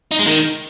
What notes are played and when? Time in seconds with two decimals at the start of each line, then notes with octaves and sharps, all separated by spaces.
0.11 D#4
0.19 G#3
0.27 D#3